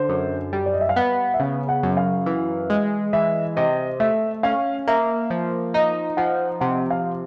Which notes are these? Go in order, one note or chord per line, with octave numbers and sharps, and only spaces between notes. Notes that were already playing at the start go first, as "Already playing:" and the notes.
Already playing: D3 C5
F#2
G3
D5
D#5
E5
F5
B3 F#5
E5
C#3 F5
F#5
F#2
F5
E3
G#3
E3 E5
C3 D#5
A3 E5
C#4 F5
A#3 E5
F3
D#4 D#5
F3 F#5
C3 F#5
F5